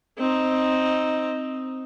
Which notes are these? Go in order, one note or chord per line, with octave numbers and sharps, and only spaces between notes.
C4 D#4